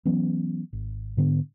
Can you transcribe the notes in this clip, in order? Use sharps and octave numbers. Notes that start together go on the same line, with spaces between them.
E3 F#3 B3 C#4
G#1
G#2 D3 B3